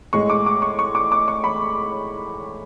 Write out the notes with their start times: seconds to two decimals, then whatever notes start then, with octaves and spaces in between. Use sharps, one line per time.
0.13 A2 G#3 C#6
0.30 D6
0.46 D6
0.62 C#6
0.79 C#6
0.95 D6
1.12 D6
1.28 C#6
1.44 B5